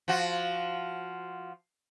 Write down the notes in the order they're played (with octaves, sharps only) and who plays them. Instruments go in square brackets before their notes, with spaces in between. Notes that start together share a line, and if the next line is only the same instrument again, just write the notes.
[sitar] F3 F#4